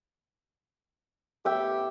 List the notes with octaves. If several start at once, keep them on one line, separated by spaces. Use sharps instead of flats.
A2 B3 G4 E5 G5 E6